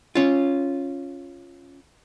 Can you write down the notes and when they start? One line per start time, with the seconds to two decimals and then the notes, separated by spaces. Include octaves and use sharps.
0.15 C#4 F4